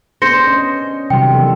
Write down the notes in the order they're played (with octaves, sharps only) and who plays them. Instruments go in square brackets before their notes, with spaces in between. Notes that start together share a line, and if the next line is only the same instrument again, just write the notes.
[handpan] B3 D4 G#4 [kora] C5 [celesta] A#6 C#7
[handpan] C#4 D#5
[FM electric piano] C3 F#3 C6 [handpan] D#3 G3 [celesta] G5
[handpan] E3 B3 A4